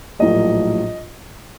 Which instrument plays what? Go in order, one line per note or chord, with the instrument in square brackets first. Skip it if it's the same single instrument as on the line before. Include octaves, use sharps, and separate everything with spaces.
[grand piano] A#1 A2 F#3 A#3 D#5